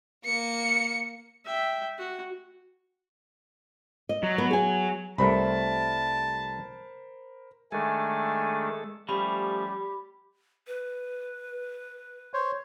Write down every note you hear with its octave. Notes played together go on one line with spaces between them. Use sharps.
A#3 C#7
E5 G5
F#4
D#5
F#3
B3
G#4 G#5
C2 G3 A3 A#4 C5 A5 B5
D#3 G#3 A3 D4 A4 G#5
F3 G3 A3 C#4 G4 B5
B4
C5 C#5